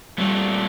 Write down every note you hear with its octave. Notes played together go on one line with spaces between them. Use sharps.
A#2 G3 A3 C4